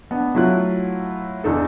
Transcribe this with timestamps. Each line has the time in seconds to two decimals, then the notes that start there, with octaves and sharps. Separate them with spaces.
0.11 B3 D4
0.35 F#3 A3 E4 F4 F#6
1.44 E2 D4 D#4 A4